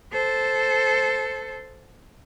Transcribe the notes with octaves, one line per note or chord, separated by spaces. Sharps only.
A4 C5